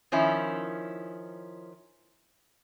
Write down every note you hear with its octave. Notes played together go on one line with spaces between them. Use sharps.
D#3 F3 C#4 E4